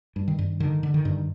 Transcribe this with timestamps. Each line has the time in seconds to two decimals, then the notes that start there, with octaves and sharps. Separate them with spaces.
0.16 G2
0.28 D#3
0.39 G2
0.60 D3 D#3
0.83 D3
0.94 D#3
1.05 G2